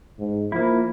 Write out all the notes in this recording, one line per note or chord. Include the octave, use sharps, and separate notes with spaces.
G#2
F3 A#3 E4